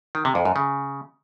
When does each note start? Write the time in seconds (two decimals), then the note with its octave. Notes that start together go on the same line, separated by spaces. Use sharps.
0.15 D#3
0.25 C3
0.35 F2
0.45 F#2
0.56 C#3